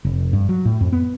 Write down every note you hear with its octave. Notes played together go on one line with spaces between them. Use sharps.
F1
G2
F#3
A2
F2
B3